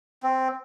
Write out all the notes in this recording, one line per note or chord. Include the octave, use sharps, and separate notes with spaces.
C4